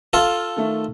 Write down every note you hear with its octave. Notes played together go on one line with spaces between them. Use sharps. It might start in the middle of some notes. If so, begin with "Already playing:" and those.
F4 A4 F5
D#3 A3